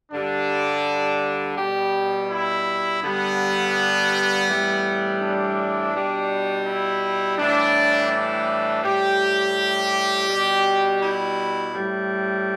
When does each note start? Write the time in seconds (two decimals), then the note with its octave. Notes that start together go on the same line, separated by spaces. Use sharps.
0.12 G2 D3 G3 D4
1.57 B2 G3 G4
2.30 E4
3.02 G2 D3 G3 B3
4.48 A2 E3 G3
5.21 D4
5.93 B2 G3
6.66 E4
7.37 A2 E3 G3 D4
8.11 D4
8.83 A2 G3 G4
10.28 B2 G3
11.01 E4
11.74 A2 G3